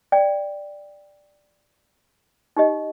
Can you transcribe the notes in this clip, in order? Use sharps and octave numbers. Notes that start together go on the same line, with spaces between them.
D5 G5
D#4 G4 D#5